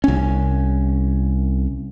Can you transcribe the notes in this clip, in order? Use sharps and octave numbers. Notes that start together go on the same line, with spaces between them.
C2 C#4